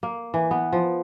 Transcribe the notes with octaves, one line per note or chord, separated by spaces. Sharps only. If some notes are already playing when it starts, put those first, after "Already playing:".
A#3
E3
B3
F3